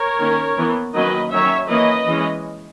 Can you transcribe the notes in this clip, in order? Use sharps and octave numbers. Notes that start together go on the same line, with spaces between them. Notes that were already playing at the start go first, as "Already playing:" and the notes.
Already playing: A#4 C#5
D#3 A#3 C#4
E3 B3
D#3 F#3 A#3 C#4 B4 D#5
D#3 F#3 C#4 C#5 E5
E3 A#3 C#4 B4 D#5
E3 G#3 C#4